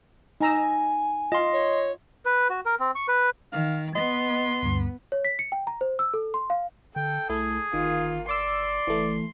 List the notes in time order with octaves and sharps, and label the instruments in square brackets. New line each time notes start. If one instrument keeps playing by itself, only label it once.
[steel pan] D#4 A#5 E6 [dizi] G#5
[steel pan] F4 [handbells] D#5 C6
[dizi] C#5
[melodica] B4
F#4
A#4
C4
C#6
B4
[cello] D#3 [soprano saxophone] F5
[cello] B3 [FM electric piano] D#5 [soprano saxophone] C6
[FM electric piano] D2 G2
[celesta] C#5
B6
C#7
G5
A#5
C5
E6
A4
C6
F5
[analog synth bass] D3 [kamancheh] A4 [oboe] G5
[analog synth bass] C2 [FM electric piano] A3 E4 [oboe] G#4
[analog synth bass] G1 [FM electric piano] D#3 [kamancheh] A#3 F4
[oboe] D5 [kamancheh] C6 [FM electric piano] D6 E6
[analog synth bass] F#1 [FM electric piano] E3 A3